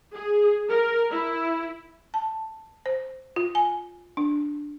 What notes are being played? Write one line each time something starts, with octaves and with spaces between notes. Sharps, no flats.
G#4
A#4
E4
A5
C5
F4
G#5
D4